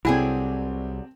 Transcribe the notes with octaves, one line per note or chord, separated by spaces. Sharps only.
C2 C3 F#3 C4 E4 G#4 A4 D5